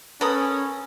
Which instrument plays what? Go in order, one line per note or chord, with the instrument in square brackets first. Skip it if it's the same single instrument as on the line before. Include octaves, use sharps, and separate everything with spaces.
[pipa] B3 A4 [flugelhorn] C#4 [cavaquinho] A#4 B5 D#6